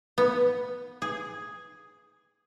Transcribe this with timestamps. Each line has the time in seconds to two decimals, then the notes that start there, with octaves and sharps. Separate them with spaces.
0.18 B3
1.02 G#4